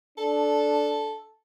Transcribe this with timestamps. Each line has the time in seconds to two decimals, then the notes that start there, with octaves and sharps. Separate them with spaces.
0.18 D4 A4